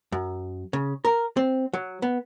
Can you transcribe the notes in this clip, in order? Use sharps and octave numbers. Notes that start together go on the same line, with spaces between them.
F#2
C#3
A#4
C4
F#3
B3